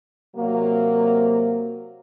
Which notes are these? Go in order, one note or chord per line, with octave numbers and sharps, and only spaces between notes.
C3 F#3 A#3